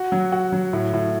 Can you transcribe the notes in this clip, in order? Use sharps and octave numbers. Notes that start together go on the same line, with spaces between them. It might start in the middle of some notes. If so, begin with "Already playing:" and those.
Already playing: F#4
F#3
F#4
F#3
A2
A2